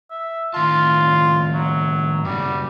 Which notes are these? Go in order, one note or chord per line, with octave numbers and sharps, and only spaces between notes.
E5
A2 D#3 F4 A5
F#3
F#2 A2 C#3 G3